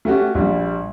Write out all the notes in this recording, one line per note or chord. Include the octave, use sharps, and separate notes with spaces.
A3 C#4 F#4 G4
A#1 G3